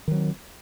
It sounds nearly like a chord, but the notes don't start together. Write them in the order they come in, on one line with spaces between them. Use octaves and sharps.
D#3 F#3 C4